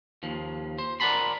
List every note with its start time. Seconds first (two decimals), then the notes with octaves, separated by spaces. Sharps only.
0.23 D#2 F3
0.78 C5
1.00 A#4 D5 F#5 A5 B5 C6